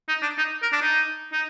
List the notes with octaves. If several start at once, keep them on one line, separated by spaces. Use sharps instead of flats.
D#4
D4
D#4
A#4
D4
D#4
D#4